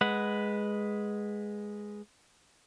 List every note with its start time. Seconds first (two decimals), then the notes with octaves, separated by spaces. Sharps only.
0.01 G#3 B4 F#5